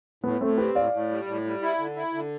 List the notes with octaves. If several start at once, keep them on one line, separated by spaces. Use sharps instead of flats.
A2 B3
A2 A3 C4
C4 G4 B4
A2 D5 F5
A2
G3
A2
G3
E4
D3
E4
D3